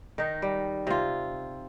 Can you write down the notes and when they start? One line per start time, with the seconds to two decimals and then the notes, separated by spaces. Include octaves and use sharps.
0.18 D#3 D#4
0.42 G3
0.87 C3 F4